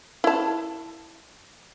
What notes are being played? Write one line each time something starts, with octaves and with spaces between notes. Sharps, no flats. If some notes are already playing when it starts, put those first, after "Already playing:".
E4 A5